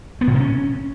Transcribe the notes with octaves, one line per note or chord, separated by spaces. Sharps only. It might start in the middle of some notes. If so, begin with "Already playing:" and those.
B3
A2
C3
C#4